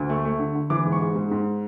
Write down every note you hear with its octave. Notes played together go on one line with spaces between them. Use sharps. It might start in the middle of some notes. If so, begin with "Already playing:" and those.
Already playing: D2
A3
A3
D3
D3
E3 D6
G#2
C#6
G#2
G#2
G#2